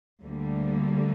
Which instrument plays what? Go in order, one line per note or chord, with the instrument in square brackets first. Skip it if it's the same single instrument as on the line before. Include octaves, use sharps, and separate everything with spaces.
[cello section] D2 D3 G3 A#3